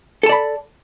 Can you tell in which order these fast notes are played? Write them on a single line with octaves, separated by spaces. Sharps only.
A4 A5 D5 B5